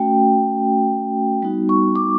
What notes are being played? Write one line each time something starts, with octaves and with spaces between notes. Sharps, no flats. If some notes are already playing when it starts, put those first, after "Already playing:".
Already playing: A3 C#4 F#4 G5
G3 B3 D#4 F#4
C#6
D6